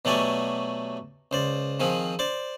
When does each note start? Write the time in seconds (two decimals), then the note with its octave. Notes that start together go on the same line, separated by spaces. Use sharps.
0.05 B2 F#3 A3 G4 D5 G#5
1.31 C#2 C5 D5
1.80 D#3 F3 C4 G#4
2.19 C5 D5 D6